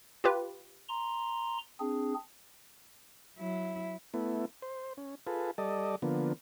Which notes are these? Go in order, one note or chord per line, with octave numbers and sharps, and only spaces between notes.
F4 G4 B4
A#5 C6
C4 D4 G#4
F#3 E4
A3 B3 E4
C5
C#4
F4 G#4 A4 B4
G3 A4 D5 D#5
D3 F3 A#3 B3